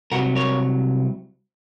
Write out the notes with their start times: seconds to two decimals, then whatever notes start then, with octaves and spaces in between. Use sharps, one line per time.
0.12 C2 C3 F#3 F#4 A#4
0.35 A#4 C#5